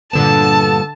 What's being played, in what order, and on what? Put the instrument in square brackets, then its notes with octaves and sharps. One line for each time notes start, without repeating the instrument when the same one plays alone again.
[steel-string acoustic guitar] G2 A#2 B3 [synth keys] D3 E7 [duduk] A4 [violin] A5